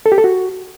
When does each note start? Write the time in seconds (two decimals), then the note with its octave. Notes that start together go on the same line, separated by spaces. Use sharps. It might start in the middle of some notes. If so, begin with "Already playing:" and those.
0.06 A4
0.12 G4
0.18 A4
0.24 F#4